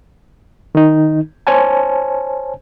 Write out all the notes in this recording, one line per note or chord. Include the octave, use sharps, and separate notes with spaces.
D#3 D#4
C5 C#5 G#5 A5